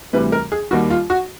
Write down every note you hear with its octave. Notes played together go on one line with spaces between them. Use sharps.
D2 C3 E3 G3 B4
A#4
G#4
D#2 D#3 G3 F#4
F4
F#4